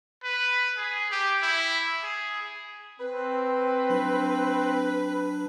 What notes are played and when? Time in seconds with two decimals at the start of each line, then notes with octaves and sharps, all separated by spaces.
0.24 B4
0.77 G#4
1.12 G4
1.43 E4
2.03 G#4
2.99 C4 B4
3.90 F#3 D4